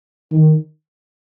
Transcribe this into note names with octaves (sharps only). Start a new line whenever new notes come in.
D#3